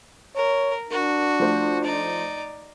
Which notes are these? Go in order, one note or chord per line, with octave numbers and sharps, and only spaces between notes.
A#4 C#5
D4 F#4 A#4
F3 A3 C5
D#4 D5